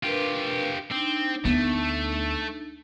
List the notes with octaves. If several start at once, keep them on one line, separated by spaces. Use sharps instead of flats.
D4 F4 G4 A#4 B4
C4 D4 D#4
D2 A3 B3